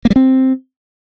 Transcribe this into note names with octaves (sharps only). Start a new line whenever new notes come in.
A#3
G3
C4